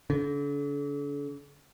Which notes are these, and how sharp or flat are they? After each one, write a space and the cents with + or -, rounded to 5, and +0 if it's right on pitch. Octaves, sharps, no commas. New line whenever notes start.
D3 -40